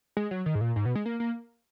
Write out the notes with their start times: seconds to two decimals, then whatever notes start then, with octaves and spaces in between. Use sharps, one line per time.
0.17 G#3
0.31 F#3
0.46 D#3
0.55 G#2
0.61 A#2
0.76 G#2
0.85 B2
0.95 G#3
1.06 A#3
1.20 A#3